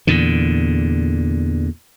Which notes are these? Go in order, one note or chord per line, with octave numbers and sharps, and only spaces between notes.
E2 A#2 D3